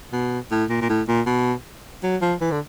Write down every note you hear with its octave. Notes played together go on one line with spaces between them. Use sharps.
B2
A2
A#2
A#2
A2
A#2
B2
F#3
F3
E3
D3